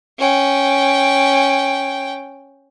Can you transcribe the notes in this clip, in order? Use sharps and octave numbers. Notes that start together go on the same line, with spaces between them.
C#4 G5